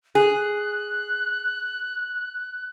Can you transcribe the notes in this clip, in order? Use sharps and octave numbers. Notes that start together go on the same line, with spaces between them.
G#4 F#6